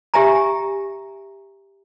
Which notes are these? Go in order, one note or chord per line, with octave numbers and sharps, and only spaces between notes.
G4 E5 G#5 A#5